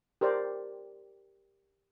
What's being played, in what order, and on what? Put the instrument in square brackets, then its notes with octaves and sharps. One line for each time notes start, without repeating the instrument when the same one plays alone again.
[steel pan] G4 A#4 C5 D5